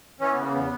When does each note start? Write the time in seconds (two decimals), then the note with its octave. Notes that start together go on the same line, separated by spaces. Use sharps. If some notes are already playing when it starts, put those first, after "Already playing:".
0.20 E3 C#4
0.31 B3
0.36 C#3
0.42 A#3
0.52 E2 B3